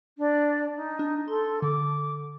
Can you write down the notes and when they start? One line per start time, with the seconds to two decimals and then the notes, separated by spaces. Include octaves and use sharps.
0.18 D4
0.76 D#4
0.99 D4
1.28 A4 C6
1.62 D3 D6